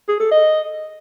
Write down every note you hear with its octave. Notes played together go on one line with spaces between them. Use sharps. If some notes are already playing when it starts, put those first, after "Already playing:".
G#4
A4
D#5